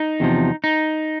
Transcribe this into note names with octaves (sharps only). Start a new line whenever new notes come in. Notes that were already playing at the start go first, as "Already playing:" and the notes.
Already playing: D#4
E2 C3 F3
D#4